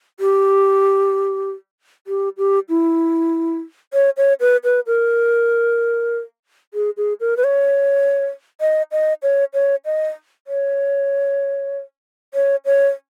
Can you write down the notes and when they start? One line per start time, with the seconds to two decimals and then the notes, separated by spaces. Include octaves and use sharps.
0.20 G4
2.07 G4
2.38 G4
2.69 E4
3.94 C#5
4.17 C#5
4.41 B4
4.64 B4
4.87 A#4
6.74 G#4
6.97 G#4
7.20 A#4
7.37 B4
7.44 C#5
8.61 D#5
8.92 D#5
9.23 C#5
9.54 C#5
9.85 D#5
10.47 C#5
12.34 C#5
12.65 C#5